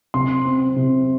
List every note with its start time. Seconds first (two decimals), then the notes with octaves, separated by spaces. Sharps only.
0.14 C3 C6
0.45 C4
0.76 C3